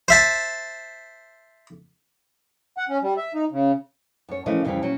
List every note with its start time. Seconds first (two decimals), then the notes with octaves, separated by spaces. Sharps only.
0.08 C5 E5 A5
2.78 F#5
2.89 C#4
3.02 G3
3.17 E5
3.35 D#4
3.51 C#3
4.29 F#2 C#5
4.46 E3 F3 A3 C#4 A#4 D#5
4.65 F2 C#3 E3 G3 G4
4.82 A#2 F#3 C#4